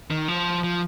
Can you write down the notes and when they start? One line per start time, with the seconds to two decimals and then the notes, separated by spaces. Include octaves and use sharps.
0.11 D#3
0.28 F3
0.64 F3